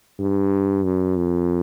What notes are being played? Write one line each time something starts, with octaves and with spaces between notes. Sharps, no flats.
G2
F#2
F2